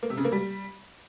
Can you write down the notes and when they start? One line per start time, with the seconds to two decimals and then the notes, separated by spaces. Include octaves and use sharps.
0.03 A#3
0.10 C3
0.17 C#3
0.25 A#3
0.32 G3